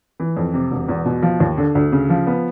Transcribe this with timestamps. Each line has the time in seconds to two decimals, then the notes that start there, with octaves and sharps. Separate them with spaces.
0.20 E3
0.37 F2
0.54 C3
0.71 E1
0.89 E2
1.05 B2
1.22 F3
1.40 D#2
1.58 D3
1.75 D2
1.92 C#3
2.09 F3
2.27 B3